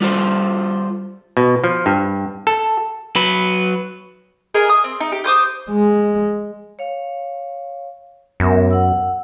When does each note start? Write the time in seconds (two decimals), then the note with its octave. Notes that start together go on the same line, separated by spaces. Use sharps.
0.01 G3 F4 A4 C5
1.37 B2
1.64 F3
1.86 G2
2.47 A4
3.16 F#3 B4
4.54 G#4 A#4 D#5 G#5
4.69 D#6
4.84 C4
5.00 D#4
5.12 G4
5.24 C5 D6 D#6 G6
5.69 G#3
6.79 C#5 F5
8.40 F#2 B3 A#4 E5
8.71 F#5 E6